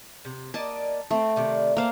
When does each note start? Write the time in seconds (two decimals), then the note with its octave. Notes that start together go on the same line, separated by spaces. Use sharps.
0.25 C3
0.54 A#3 D5 D#5 A5
1.11 A3 C4
1.36 C3 D#3 D5
1.77 A#3 D4 C5 F5